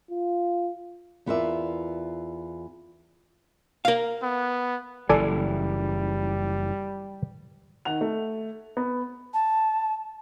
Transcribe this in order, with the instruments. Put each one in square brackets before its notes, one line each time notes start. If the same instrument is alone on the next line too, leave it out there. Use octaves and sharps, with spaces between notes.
[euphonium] F4
[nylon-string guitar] E2 B3 F4 A#4 D5 E5
[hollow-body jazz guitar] A#4 F5
[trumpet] B3
[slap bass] F#1 E3 [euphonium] G3 [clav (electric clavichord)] A4 D5 G#5
[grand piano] D#3 F#5 F7
A3
B3
[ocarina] A5